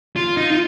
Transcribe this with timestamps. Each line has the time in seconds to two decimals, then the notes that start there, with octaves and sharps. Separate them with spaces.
0.16 F4
0.37 D#4
0.52 F4